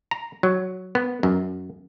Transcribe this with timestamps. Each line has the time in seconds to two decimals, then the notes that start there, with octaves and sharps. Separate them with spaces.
0.11 A#5
0.43 F#3
0.95 B3
1.23 F#2